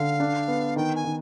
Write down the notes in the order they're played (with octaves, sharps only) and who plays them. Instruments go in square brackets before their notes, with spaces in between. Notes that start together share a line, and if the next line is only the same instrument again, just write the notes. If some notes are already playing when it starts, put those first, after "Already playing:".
Already playing: [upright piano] D3 [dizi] F5
[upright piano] D4
B3
[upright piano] D#3 [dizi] G5
[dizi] G#5
[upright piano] D#3